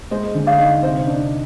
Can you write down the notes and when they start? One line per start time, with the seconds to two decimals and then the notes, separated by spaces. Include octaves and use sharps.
0.11 G#3 C5 D#5
0.35 D3
0.47 D5 F5
0.59 D#4
0.82 C3 C5 D#5
1.07 D4